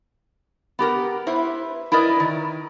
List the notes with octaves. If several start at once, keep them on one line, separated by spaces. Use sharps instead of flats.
B3 G4 A#4
E4 B4 C5
E4 A#4 B4 D5 D#5
D#3